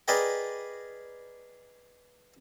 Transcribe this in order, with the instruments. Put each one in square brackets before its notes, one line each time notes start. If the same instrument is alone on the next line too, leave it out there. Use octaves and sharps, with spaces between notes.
[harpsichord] G#4 A#4 B4 D5 D#5 G5